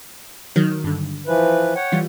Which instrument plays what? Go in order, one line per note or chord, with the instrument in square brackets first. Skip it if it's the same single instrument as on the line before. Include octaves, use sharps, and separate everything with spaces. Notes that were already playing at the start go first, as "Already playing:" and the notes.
[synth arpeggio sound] D#3 F#3
G2 D3
[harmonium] E3 F3 B4
C#5 F#5 G5
[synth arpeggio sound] E3 G3 F4